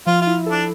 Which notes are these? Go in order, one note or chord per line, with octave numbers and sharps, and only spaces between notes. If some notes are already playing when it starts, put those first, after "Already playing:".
F3 F4
F4
E4
D4 A4